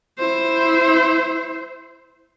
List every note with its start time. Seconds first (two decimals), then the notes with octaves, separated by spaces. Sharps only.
0.19 E4 C5